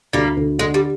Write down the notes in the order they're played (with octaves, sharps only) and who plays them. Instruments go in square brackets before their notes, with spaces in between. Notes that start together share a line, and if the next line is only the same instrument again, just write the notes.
[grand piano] D2 [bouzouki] G3 A#3
[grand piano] D2
[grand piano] D3 [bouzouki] G#3
[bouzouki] G3